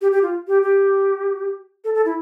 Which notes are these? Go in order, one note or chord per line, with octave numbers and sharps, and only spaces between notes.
G4
G4
F4
G4
G4
A4
A4
E4